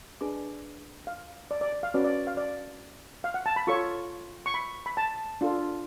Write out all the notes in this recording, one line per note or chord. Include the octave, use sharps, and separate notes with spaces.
D4 G#4 B4 D6
F5
D5
D5
D5
F5
C#4 F#4 B4 D5
D5
F5
D5
F5
F#5
A5
B5
F4 A4 C#5 C#6
C#6
B5
B5
A5
D4 F4 A4